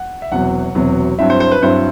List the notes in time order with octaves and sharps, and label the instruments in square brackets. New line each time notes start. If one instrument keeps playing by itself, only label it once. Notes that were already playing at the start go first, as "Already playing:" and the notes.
Already playing: [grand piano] F#5
E5
E1 E2 C3 F#3 B3 F#5
E1 E2 C3 F#3 B3
G2 F#3 C4 E4 E5
C5
C5
B4
G2 F#3 C4 E4 C5